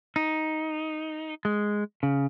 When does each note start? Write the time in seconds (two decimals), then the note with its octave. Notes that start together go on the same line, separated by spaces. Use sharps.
0.16 D#4
1.45 G#3
2.03 C#3